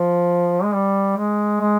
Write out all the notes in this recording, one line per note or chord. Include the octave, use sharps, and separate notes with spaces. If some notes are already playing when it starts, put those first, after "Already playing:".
Already playing: F3
G#3
G3
G#3
G#3